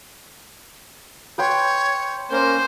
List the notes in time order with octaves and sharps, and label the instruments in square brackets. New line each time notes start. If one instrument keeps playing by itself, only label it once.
[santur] B4 G5 C6 [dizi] C#5
[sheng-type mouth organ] A#3 C#4 A#4 [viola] C5